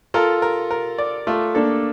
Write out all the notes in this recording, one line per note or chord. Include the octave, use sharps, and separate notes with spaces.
F4 A4 A#4
A#4
A#4
D5
A3 F4 A4
A#3 D4 A4